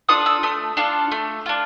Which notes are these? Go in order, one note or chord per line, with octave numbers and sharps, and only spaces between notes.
D4 F4 A4 D#6
E6
A3 D#6
D4 F4 A4
A3
D4 F4